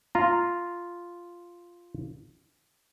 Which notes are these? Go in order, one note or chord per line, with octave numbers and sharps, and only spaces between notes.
F4 A#5